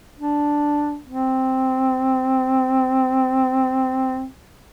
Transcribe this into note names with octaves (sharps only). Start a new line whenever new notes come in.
D4
C4